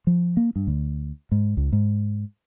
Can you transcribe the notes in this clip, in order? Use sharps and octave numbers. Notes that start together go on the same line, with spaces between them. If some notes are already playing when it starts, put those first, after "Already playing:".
F3
A#3
G2
D2
G#2
C#2
G#2